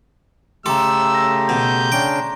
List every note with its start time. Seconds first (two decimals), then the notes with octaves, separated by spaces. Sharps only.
0.66 C#3 A3 G4 A4 A#5 C6 E6
1.15 A#6
1.49 B2 G6
1.92 C#3 C#4 D4 G5